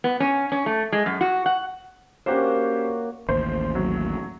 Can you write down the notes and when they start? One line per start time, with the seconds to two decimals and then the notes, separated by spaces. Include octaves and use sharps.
0.04 B3
0.20 C#4
0.52 C#4
0.66 A3
0.92 G#3
1.06 F#2
1.21 F#4
1.46 F#5
2.26 A#3 C#4 D4 F#4 G4 C5
2.61 C#5
3.29 A1 D#2 C5
3.75 F#3